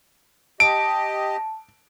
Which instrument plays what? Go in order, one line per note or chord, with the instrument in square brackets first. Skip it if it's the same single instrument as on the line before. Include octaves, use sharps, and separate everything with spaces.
[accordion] G4 D#5 [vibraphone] A5 [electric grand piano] D7